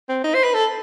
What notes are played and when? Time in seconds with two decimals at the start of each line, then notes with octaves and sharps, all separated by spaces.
0.08 C4
0.24 D#4
0.34 C5
0.44 B4
0.54 A4